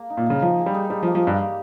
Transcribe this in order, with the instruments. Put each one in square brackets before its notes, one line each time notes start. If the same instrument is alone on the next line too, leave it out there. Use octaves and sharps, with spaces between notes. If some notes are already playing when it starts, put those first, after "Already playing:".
Already playing: [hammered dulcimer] A#3
D#4
[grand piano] A#2
[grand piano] C#3 [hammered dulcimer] A#3
[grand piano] F3 [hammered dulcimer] D#4
[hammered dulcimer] G#4
[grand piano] G3
[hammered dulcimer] D#4
[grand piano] G3 [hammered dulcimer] G4
[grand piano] F3
[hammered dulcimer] A#3
[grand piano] F3
[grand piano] G2 [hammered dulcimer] G4
[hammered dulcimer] G3